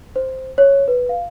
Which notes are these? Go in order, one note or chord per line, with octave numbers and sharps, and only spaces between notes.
C5
C#5
B4
F5